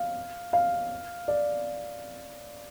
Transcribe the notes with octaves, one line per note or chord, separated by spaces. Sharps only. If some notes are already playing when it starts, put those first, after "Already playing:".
Already playing: F5
F5
D5